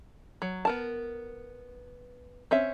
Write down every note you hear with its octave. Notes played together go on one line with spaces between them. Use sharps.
F#3
B3 A#4 A5
C4 C#4 E5